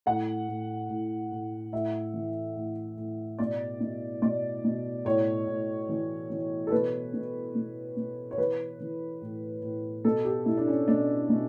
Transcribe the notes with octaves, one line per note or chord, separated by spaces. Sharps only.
A2 F#5
A2
A2
A2
A2 E5
E3
A2
A2
B2 D5
B2
B2 D5
B2
A2 C#5
A2
E3
E3
A4
B2 B4
B2
B2
B2
C#5
E3 B4
E3
A2
A2
B2 A4
G4
B2 E4
D4
C#4
B2 D4
B2